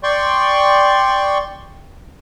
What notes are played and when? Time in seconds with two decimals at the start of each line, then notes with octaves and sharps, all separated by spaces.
0.03 D5 G5 C6 C#6